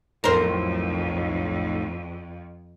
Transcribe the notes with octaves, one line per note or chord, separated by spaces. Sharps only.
B1 F2 A2 A#4 C5